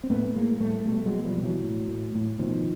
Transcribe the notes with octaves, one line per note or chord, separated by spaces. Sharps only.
C4
A2 A3 B3
A2 G#3 A#3
A2 G3 A3
B2 G3 A3
F#3 G#3
B2
F3 G3
B2
E3 F#3
A2
A2
A2
B2 D#3 F3